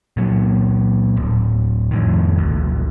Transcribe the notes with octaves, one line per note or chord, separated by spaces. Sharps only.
A#2 F#3
D1
F2 A2 D#3
G#1 D2